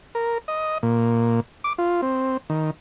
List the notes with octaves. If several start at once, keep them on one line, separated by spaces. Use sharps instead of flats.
A#4
D#5
A#2
D6
F4
C4
D#3